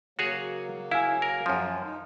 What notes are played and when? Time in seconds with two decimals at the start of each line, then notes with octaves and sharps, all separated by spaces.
0.19 C#3 F#3 A#3 F#4 G#4 C#5
0.91 E4 F5 G#5
1.22 A#4
1.46 F#2 F3 C#4
1.83 D#4